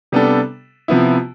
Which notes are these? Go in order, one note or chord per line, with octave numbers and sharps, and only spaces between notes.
C3 G3 B3 D4 A4
C3 F3 B3 E4